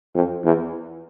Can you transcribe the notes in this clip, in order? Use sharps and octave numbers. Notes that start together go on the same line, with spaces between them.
F2
E2